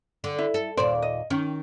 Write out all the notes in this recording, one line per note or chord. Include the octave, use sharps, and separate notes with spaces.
D3
E4
A4
D#2 A#2 C5 D5
D#5
D#3 C#4